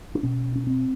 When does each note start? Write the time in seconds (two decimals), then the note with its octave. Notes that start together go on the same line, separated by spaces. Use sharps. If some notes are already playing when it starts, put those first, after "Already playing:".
0.15 D4
0.23 B2 C#4
0.56 C#4
0.67 C4